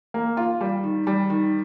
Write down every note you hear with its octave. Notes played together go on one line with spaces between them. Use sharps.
A#3
F4
G3
D#3
G3
D#3